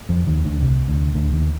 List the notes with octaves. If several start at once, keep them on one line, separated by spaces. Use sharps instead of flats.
F2 F3
D#2 D#3
D2 D3
C2 C3
D2 D3
D2 D3
D#2 D#3